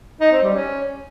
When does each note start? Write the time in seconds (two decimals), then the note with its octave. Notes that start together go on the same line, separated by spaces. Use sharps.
0.21 D#4
0.32 C4
0.43 G3
0.54 C#4